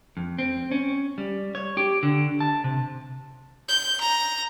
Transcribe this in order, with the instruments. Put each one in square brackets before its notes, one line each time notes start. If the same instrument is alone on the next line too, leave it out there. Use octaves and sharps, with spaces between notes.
[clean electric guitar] F2
C4
C#4
G3
C#5
G4
D3
A5
C3
[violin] G6
A#5